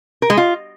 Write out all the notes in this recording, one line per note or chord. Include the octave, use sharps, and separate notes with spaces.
A#4
G#3
F4